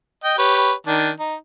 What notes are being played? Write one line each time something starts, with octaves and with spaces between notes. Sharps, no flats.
D#5 G5
G4 B4 C#5
D#3 D4
D#4